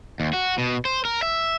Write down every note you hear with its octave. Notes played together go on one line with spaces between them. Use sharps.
D#2
F#4
B2
C5
A#4
E5